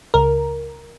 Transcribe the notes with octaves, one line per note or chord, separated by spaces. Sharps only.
C#2 A#4